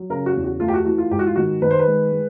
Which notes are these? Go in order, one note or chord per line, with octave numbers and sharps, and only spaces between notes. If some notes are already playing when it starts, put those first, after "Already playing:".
Already playing: F#3
C#3 A#4
F#4
E2
F#4
A3 F4
G4
F#4
E3 F#4
F4
G#2 G4
F#4
F4
D#3 F#4
D#3 B4
C5
B4
G#3
G#3